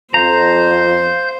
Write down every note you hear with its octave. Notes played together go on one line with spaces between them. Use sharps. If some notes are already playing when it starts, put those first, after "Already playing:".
F2 C5 F5 A#5 G6